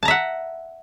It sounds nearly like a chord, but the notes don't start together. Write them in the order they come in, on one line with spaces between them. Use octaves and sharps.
A5 A#5 E5 F#5